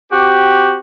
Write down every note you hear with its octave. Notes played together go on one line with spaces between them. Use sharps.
C4 F#4 G4